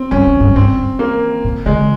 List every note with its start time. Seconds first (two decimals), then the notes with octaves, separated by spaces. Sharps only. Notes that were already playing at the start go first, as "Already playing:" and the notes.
Already playing: C4
0.11 G2 C#4
0.26 F2
0.40 G2
0.50 F2
0.56 G2 C4
0.77 G2
0.99 A#3
1.44 A#2
1.66 C#3 G#3